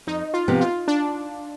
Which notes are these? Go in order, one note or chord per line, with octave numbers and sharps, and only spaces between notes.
F2 D#4
F4
C3 F3 B3
F4
D4